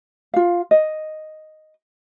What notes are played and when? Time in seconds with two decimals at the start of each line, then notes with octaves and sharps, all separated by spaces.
0.34 F4 F5
0.71 D#5